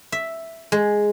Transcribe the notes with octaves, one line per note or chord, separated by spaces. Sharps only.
E5
G#3